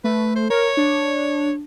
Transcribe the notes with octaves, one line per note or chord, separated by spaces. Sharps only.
A3 B4
C5
A#4 C#5
D4